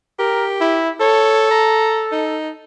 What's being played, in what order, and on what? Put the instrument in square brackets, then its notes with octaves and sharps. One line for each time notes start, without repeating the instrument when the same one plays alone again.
[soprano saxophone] G4 [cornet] A#4
[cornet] E4
[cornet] A4 [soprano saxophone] C#5
[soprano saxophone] A#5
D#4